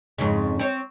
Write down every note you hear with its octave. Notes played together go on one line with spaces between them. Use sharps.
F2 G#2 C#3
C4 C#5